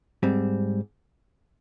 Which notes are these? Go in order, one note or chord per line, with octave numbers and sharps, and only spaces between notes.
G#2 G3 C4